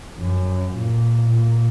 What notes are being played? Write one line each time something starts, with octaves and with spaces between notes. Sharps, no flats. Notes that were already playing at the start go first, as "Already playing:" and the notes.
F#2
A#2
A#2